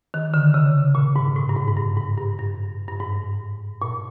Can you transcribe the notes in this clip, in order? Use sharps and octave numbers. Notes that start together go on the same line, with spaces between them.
D#3
D3
C#3
A#2
G#2
A2
G2
G#2
G#2
G2
G#2
G2
G2
G2
G#2
A#2